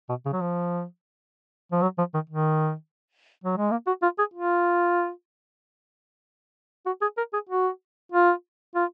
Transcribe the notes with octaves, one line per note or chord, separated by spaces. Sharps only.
B2
C#3
F#3
F3
F3
F#3
F3
D#3
D#3
F#3
G#3
A#3
F#4
F4
G#4
F4
F#4
G#4
A#4
G#4
F#4
F4
F4